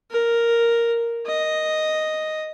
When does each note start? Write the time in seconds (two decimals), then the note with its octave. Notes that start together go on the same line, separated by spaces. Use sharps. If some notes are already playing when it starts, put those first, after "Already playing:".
0.11 A#4
1.27 D#5